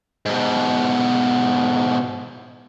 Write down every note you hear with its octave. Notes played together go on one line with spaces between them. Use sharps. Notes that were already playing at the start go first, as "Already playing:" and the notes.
G#2 B2